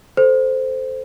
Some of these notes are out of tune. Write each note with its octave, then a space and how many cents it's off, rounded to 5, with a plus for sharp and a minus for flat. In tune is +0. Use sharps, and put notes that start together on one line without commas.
A4 -5 C5 -10